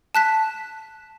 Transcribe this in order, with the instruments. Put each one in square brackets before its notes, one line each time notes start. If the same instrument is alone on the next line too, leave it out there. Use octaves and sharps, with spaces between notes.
[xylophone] A5 F#6 B6